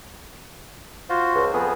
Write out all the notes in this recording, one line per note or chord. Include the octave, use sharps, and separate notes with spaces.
F4 F#4 C5
C#2
F2 B3 G#4